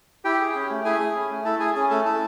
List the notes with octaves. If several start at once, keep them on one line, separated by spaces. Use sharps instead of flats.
E4 G4 G5
G#4
C#4
A3
E4 G#4 G#5
G#4
C#4
A3
E4 A4 A5
G#4 G#5
C#4 G#4 G#5
A3 A4 A5
E4 A4 A5